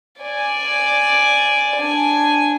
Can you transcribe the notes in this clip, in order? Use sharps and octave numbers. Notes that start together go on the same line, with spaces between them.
D5 G#5
D4 G#5